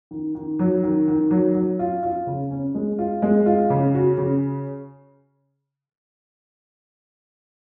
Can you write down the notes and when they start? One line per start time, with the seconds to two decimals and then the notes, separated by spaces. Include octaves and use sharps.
0.11 D#3
0.35 D#3
0.59 F#3
0.83 D#3
1.08 D#3
1.31 F#3
1.55 F#3
1.79 F4
2.03 F4
2.27 C#3
2.51 C#4
2.75 G#3
2.99 F4
3.22 G#3
3.46 F4
3.70 C#3
3.94 F#4
4.18 C#3